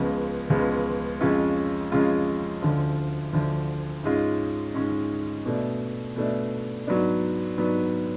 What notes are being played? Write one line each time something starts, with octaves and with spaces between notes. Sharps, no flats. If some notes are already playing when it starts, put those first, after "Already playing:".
Already playing: C#2 C#3 F3 G#3 B3
C#2 C#3 F3 G#3 B3
F2 C#3 G#3 C#4 F4
F2 C#3 G#3 C#4 F4
D2 D3 F3
D2 D3 F3
G#2 G#3 C#4 F4
G#2 G#3 C#4 F4
B2 A3 D4
B2 A3 D4
G#2 F#3 B3 D4
G#2 F#3 B3 D4